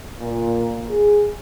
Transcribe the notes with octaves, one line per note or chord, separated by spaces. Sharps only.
A#2
G#4